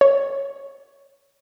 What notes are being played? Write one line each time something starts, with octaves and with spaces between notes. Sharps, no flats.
C#5